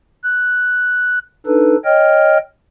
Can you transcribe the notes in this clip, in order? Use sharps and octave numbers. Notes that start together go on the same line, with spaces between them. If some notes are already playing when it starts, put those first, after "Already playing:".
F#6
D4 D#4 A4 B4
C#5 D#5 G5 F6